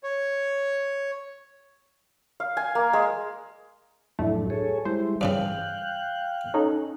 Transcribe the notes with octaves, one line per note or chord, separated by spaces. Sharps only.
C#5
F5
G#5
A#3
G#3
F2 A2 F#3 A3 D4
G#4 A4 C#5
G3 G#3 E4 C5
G2 C#3 E3 F5 G5 F#6
C#4 D#4 A4